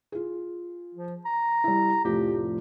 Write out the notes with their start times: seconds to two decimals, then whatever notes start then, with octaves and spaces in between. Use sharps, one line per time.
0.12 F4 G#4
0.95 F3
1.25 A#5
1.64 G3 E4
2.05 F1 A2 F3 G4